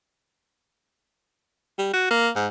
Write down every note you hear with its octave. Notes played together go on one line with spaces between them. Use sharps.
G3
F#4
A#3
G#2